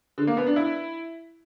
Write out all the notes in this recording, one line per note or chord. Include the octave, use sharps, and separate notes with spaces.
D3
A#3
B3
D4
E4